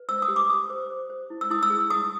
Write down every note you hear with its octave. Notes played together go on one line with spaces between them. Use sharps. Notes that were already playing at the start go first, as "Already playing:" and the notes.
Already playing: B4
C5 E6
D#6
G4
D6
G4 D#6
C5
C5
C5
E4
E6
E4 D#6
E6
G#4
E4 D#6